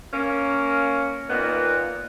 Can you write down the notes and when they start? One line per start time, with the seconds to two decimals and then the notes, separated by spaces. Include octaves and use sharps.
0.14 A#3 C#4
1.29 A#2 D#3 A#3 B3